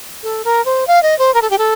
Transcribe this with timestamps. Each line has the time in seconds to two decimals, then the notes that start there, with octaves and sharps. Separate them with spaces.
0.23 A4
0.45 A#4
0.65 C5
0.87 F5
1.03 D#5
1.19 C5
1.34 A#4
1.42 A4
1.50 G4
1.58 A4